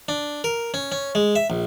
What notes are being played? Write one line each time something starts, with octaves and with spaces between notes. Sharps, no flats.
D4
A#4
C#4
C#4
G#3
E5
A#1